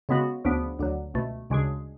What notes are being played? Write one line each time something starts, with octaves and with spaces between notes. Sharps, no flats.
C#3 G#3 B3 F#4
D2 C#3 F3 B3 D4
D2 D3 F#3
C#2 B2 A3
D2 C#3 G#3 D4 G#4